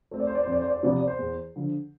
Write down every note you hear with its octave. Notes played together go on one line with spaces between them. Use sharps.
A3 C4 C5
D5
C5
D5
C5
F2
D5
C5
D5
C5
C3 F3 B3 D5
C5
D5
C5
E2
D3 F3